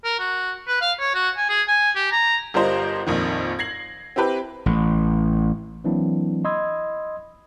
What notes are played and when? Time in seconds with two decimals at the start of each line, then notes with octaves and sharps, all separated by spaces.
0.04 A#4
0.19 F#4
0.68 B4
0.81 F5
0.99 C#5
1.14 F#4
1.37 G#5
1.49 G#4
1.68 G#5
1.95 G4
2.12 A#5
2.54 G1 G3 F4 A#4 C5 D#5
3.06 A#1 F2 D#3
3.59 G#6 A#6 C7 F#7
4.16 C4 E4 G4 B4
4.66 A1
5.84 E3 F#3 A#3 C4 D4 E4
6.45 D#5 B5 C6 D#6 E6 G#6